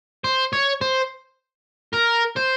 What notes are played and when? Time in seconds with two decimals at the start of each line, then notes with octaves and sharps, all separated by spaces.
0.24 C5
0.53 C#5
0.81 C5
1.94 A#4
2.37 C5